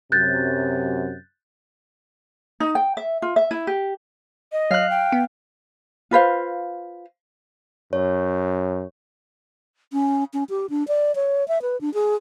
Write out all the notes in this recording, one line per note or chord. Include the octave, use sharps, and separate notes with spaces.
F#2 C3 F#3 F#6 G6 A6
D#4
G5
E5
F4
E5
E4
G4
D#5
F#3 F5 F#6
G5
B3
F4 B4 C5 F5
F#2 C#5
C#4
C#4
G4
D4
D5
C#5
E5
B4
D4
G#4